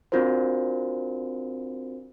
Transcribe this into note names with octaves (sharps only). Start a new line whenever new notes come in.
C4 D4 F4 F#4 A#4 C5